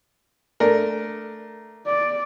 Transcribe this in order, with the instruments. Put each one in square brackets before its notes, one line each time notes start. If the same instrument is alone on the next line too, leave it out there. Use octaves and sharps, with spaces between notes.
[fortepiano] A3 D4 A#4
[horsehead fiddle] D5